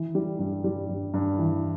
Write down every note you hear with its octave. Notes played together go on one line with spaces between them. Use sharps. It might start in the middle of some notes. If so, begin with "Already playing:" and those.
Already playing: E3
G3
G2
G3
G2
G2
E3